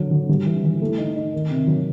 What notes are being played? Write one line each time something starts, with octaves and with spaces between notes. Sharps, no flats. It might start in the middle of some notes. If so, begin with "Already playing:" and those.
Already playing: D3 F#3
F#3
G3
E3
E3
A3
D#4
D#4
D#3
C3
F#3